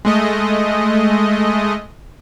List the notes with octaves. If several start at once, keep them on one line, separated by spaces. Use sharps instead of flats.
G#3 A3 D#5